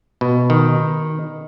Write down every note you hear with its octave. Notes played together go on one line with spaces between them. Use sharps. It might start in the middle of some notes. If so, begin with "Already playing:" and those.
B2
D#3